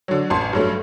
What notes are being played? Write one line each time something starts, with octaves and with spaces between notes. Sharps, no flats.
D3 F#3
A1 A5 C6
G2 F#3 A3